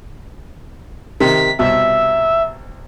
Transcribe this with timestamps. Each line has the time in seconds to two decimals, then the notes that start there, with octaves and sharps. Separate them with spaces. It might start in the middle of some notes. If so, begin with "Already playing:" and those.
1.20 C3 D#3 B6
1.59 C2 B2 E5